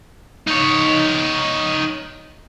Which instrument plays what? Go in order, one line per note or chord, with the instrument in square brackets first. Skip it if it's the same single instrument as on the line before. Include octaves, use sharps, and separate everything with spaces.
[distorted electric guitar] D#4 C#5